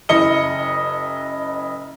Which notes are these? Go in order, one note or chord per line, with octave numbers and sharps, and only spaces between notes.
F#1 E4 D#5 C#7 G7